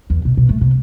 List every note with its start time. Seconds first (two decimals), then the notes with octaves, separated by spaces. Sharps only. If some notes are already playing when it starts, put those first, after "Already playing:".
0.10 E2
0.25 B2
0.37 B2
0.49 A3
0.61 C3